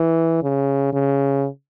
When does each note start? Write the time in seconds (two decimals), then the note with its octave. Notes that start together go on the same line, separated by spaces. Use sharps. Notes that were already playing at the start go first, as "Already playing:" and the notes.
Already playing: E3
0.43 C#3
0.93 C#3